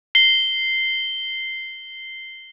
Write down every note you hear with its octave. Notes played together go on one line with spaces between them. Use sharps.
C7 G7